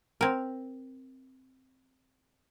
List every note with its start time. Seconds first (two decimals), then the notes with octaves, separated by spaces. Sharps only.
0.21 C4 A#4